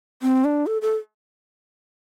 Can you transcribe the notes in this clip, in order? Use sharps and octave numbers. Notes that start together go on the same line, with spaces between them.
C4
D4
A4
A4